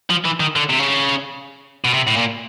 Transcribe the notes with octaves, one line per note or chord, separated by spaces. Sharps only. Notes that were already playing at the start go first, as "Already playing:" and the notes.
F3
E3
D#3
D3
C3
C#3
B2
C3
A2
A#2